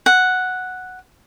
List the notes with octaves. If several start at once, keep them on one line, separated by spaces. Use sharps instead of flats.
F#5